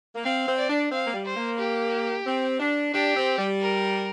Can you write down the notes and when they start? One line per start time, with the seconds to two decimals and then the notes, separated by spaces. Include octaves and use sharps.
0.15 A#3
0.24 C4 F5
0.47 C4
0.58 D5
0.69 D4
0.91 C4 F5
1.05 A#3
1.14 G3
1.26 C5
1.36 A#3
1.59 G4
2.27 C4
2.60 D4
2.93 D4 G4
3.16 C4
3.39 G3
3.61 A#4